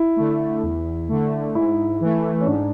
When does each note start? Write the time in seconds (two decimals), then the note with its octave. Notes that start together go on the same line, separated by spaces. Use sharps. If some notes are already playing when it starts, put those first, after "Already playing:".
Already playing: E4
0.16 D3 A3
0.63 E2
1.09 D3 A3
1.55 G#2 E4
2.01 E3 A3
2.41 C#4
2.46 G#2 D4